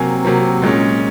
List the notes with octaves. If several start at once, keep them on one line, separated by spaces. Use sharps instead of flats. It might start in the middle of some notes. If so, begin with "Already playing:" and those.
Already playing: C3 F#3 A#3 G#5
C3 F#3 A#3
A#2 G#3 C#4